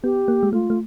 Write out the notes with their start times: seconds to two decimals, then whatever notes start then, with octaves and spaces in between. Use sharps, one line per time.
0.04 B3 G4
0.28 A#3
0.43 G#3
0.53 A3 F4
0.70 A3